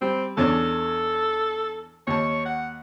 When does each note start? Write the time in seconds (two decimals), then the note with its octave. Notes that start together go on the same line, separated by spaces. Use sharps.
0.01 G3 C4
0.37 E2 C#4 D4 A4
2.07 D#2 C#5 A5
2.45 F#5